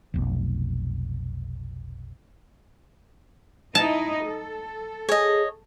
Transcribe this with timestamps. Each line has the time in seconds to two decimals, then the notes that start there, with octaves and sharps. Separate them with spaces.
0.14 F1 B1
3.75 D#4 E4 D#5 A5
4.24 A4
5.09 G#4 C#5 D#5